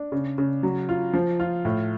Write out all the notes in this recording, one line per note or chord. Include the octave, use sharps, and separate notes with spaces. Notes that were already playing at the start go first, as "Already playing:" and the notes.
Already playing: D4
C#3
C#3
F#3
F4
F3
F4
A2